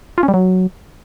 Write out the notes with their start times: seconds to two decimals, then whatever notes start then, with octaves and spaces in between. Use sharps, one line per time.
0.18 F4
0.23 C#4
0.28 G3
0.34 F#3